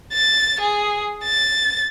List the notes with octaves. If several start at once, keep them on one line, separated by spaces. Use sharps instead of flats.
A6
G#4
A6